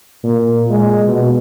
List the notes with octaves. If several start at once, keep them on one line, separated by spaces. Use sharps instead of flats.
A#2
G#3
B2